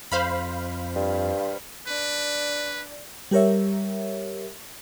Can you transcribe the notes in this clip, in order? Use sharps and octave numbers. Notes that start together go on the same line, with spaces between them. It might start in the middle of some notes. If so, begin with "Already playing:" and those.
F2 C5 F5 B5
G2
D4 B4
G3 G4 A#4 C#5 E5